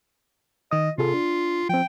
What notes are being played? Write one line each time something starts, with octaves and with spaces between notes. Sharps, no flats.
D#3 D#5 D#6
C3 F4 G#4 A4
D4
F3 C4 G5